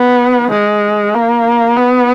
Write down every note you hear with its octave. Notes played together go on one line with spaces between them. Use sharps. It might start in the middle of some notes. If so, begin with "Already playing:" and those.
Already playing: B3
G#3
A#3
B3